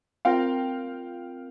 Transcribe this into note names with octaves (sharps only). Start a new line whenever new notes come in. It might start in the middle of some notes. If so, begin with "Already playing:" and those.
C4 F4 A#4 F5 G5